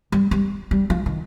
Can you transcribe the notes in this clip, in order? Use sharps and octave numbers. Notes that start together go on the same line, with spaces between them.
G3
G3
G3
F3
D#3